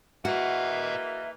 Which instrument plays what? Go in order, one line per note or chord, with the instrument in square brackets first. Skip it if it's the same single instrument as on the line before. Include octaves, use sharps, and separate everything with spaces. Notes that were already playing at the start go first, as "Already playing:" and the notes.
[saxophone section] E3 G#3 A#3 [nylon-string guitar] F#4 [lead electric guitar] D#5 F#5 [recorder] E5